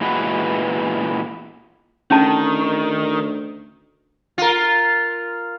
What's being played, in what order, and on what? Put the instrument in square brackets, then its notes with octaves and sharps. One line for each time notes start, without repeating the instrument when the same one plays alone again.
[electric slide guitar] A#2 E3 G#3 B3 F#4 B4
[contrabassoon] D2 [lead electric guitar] D#3 [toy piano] C#4 A5
[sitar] F4 A#4